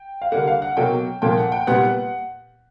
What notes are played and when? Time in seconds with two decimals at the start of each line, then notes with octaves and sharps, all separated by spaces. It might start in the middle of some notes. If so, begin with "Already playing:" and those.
Already playing: G5
0.22 F5
0.32 D3 G3 A#3 F#5
0.47 F5
0.62 F#5
0.77 B2 F#3 A#3 G5
1.22 A#2 F3 A#3 G5
1.37 F#5
1.52 G5
1.67 A#2 G3 B3 F#5